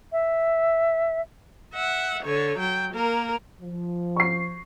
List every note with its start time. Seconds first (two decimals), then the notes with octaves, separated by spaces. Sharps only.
0.12 E5
1.74 E5 F#5
2.24 D3 C#5
2.58 F#3 G5
2.93 A#3 A#4
3.61 F3
4.16 C#6 C7